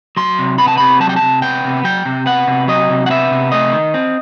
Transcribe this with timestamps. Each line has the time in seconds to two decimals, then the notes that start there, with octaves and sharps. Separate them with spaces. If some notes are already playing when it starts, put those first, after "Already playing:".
0.17 F#3 C6
0.39 C3
0.58 B3 B5
0.68 A5
0.78 C3 B5
1.00 F#3 A5
1.09 G5
1.16 C3 A5
1.42 B3 G5
1.64 C3
1.84 F#3 G5
2.05 C3
2.26 B3 F#5
2.47 C3
2.68 F#3 D#5
2.90 C3
3.06 F#5
3.10 B3 E5
3.31 C3
3.52 A3 D#5
3.73 D#3
3.94 C4